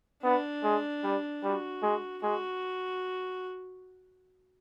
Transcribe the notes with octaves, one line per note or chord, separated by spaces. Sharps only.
B3 D4
G#3
G3
G3 F#4
G#3
G#3 F#4